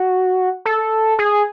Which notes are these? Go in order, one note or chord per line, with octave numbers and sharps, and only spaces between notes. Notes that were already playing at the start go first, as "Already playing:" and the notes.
Already playing: F#4
A4
G#4